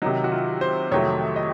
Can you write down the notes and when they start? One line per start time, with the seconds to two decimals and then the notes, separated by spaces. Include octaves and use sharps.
0.02 C3 D#3 F#3 D#4
0.24 F#4
0.31 F4
0.61 C5
0.92 F2 C3 D#3 F#3 A3 C#5
1.36 D#5